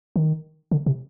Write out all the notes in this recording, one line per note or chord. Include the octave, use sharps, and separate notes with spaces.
D#3
D3
C3